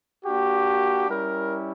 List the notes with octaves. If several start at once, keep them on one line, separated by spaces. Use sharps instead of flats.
A#3 D4 F#4 G4
G3 C#4 E4 A#4